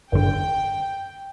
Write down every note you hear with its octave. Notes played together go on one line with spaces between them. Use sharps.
G1 D3 G5